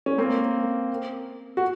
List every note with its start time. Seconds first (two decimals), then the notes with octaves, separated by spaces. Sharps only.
0.06 C#4
0.18 A#3 C4
1.57 F#4